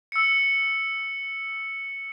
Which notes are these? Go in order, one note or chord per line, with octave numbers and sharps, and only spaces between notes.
E6 C#7